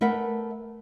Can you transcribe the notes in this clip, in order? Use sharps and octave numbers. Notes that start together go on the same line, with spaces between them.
A3 A#4 B4 E5 F#5